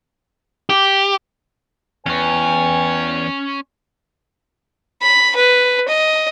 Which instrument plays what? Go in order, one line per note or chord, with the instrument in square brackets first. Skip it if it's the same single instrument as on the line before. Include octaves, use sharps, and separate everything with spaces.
[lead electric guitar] G4
[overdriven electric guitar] E2 [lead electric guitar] C#4 C#5 [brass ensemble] B4 G5 G#5
[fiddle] B5
B4
D#5